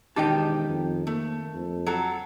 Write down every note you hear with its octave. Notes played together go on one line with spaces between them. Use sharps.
E1 D#3 D#4 G4 D#5 G5 A5
F2
A3 A#3
F2
F#3 A4